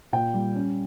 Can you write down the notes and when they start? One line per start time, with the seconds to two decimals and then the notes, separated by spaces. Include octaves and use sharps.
0.12 A#2 G5
0.34 G3
0.55 C#4